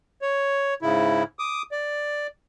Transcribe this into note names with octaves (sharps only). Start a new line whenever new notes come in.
C#5
G#2 C#3 E4
D6 D#6
D5